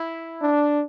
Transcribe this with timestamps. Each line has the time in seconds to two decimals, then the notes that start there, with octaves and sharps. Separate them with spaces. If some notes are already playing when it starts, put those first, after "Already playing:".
Already playing: E4
0.42 D4